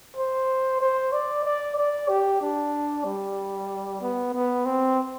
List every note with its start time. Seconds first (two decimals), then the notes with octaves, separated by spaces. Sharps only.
0.17 C5
0.81 C5
1.13 D5
1.44 D5
1.76 D5
2.09 G4
2.41 D4
3.05 G3
4.01 B3
4.34 B3
4.65 C4